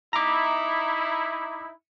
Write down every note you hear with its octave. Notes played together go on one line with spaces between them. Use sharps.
D#4 E4 A#5 D6